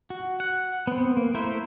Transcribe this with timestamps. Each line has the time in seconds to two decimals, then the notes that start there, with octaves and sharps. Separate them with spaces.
0.10 F#4
0.40 F#5
0.87 B3 C4
1.17 A#3
1.34 A3 E4 A#4 C5 E5